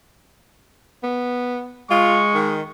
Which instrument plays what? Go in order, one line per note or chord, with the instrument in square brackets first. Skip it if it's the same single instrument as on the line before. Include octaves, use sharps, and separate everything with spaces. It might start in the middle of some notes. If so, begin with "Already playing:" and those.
[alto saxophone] B3
[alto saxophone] G#3 [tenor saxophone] F4 [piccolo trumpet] C#6
[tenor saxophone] D#3